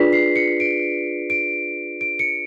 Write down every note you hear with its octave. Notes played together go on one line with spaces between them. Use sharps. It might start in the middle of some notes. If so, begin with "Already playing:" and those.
Already playing: D4 F4 G#4 B4 D5 B6
C7
C#7
D7
D7
D7
C#7